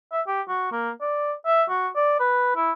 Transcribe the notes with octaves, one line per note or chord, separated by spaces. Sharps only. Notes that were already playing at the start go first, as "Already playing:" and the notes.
E5
G4
F#4
A#3
D5
E5
F#4
D5
B4
E4